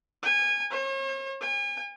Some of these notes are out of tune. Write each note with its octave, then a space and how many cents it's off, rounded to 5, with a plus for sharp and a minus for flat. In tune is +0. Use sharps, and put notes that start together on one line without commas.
G#5 -25
C#5 -45
G#5 -40